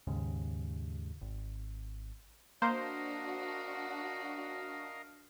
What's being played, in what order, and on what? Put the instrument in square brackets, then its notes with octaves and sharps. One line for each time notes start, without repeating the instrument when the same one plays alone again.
[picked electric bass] D#2 G#2 C#3
G#1
[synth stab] A#3 C5 [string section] D4 F#4 [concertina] A#4 D#5 F5